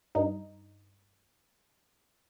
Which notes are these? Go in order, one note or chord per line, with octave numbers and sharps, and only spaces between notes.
G2 D#4